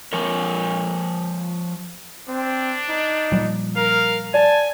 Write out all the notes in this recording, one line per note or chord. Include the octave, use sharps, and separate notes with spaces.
F3 A#4 C#5
C4 D4
D#4
A#2 F3 G3
A#4 F5
D5 G#5 A5